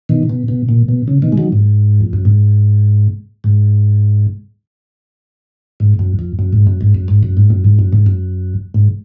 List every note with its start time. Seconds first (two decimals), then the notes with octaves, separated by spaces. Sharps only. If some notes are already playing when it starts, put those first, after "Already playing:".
0.09 B2 D#3
0.30 B2
0.48 B2
0.69 A#2
0.88 B2
1.08 C#3
1.22 B2 D#3
1.32 G#3
1.38 D#3 F#3
1.52 G#2
2.01 F2
2.13 F#2
2.25 G#2
3.44 G#2
5.80 G#2
5.99 F#2
6.19 F2
6.39 F#2
6.53 G#2
6.67 F#2
6.81 G#2
6.95 F#2
7.08 G#2
7.23 F#2
7.37 G#2
7.50 F#2
7.64 G#2
7.79 F#2
7.93 G#2
8.06 F#2
8.74 G#2